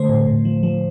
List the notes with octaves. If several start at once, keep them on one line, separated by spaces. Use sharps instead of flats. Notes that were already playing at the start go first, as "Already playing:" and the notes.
Already playing: D3 A3 C5
A2
A2
F3
F3